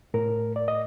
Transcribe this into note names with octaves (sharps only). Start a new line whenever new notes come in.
A2 A#4
D5
D#5